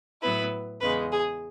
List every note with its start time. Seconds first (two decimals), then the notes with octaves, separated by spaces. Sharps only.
0.22 A2 F#3 B3 E4 B4
0.81 E2 C#3 G#3 B4
1.12 G#4